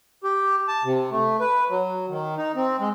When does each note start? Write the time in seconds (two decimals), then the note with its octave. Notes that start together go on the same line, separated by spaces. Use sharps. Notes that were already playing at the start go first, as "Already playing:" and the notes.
0.24 G4
0.68 A5
0.84 C3
1.11 A3
1.40 B4
1.70 F#3
2.09 D#3
2.38 D#4
2.56 C4
2.80 G#3